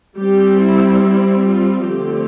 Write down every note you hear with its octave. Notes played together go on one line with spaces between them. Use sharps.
G3 C4 G4
E4
E4
F4
D3 F3 A3 C4 G4